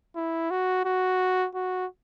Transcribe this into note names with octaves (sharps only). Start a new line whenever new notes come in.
E4
F#4
F#4
F#4